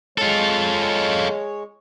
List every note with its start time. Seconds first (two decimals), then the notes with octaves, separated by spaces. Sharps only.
0.18 G#3 F4 A4 C#5